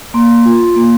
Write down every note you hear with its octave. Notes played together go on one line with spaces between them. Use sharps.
A#3 C6
F4
A#3